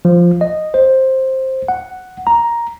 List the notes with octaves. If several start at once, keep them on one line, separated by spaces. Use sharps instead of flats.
F3
D#5
C5
F#5
A#5